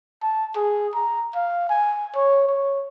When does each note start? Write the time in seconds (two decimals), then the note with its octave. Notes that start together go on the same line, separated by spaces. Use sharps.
0.23 A5
0.56 G#4
0.95 A#5
1.35 F5
1.70 G#5
2.15 C#5
2.48 C#5